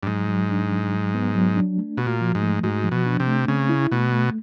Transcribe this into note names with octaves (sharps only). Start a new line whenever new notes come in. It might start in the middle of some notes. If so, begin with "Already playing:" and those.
G2
G#2 F#3
F#3
D4
F#3
F#3
B3
F#3
D4
A3
B2 F#4
A#2
F3
G#2
A3
G#2 F#4
F3
B2
D4
C3
A3
C#3 C4
E4
B2 A3
A3